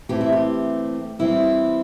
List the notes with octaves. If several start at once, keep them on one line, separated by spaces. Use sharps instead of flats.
E3 A3 C4 G4
E4
G4
E3 G3 C4 E4